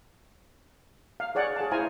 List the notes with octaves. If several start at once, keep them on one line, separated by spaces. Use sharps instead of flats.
F5
G#4 C#5 D5 F#5
G#4 A5
E4 C5 F5 G#5 A#5